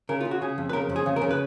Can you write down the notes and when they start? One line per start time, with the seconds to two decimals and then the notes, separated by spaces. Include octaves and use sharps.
0.09 C#3 A#4
0.21 C#3 F4
0.31 F#4
0.41 C#3 G#4
0.58 F2
0.69 B4
0.73 C#3 A#4
0.89 F2
0.96 G#4
1.06 C#3
1.16 A#4
1.21 C#3
1.31 B4